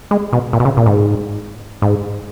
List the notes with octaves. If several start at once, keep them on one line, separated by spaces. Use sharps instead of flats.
G#3
B2
A#2
B2
C#3
A#2
G#2
G#2